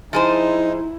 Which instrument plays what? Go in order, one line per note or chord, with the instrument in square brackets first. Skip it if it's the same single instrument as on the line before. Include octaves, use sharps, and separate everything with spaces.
[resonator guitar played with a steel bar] F3 G#4 C5 [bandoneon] D#4 [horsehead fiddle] E4